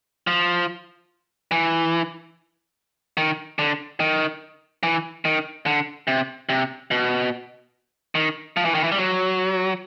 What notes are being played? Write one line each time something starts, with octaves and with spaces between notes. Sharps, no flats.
F3
E3
D#3
D3
D#3
E3
D#3
D3
C3
C3
B2
D#3
F3
E3
D#3
E3
G3
F#3